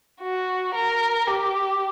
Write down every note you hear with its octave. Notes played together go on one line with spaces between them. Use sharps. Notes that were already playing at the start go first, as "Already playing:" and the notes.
F#4
A#4
G4